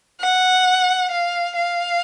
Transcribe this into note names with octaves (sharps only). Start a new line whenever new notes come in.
F#5
F5
F5